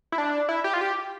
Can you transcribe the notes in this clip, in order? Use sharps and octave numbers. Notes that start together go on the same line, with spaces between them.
E4
D4
E4
G4
F4
G4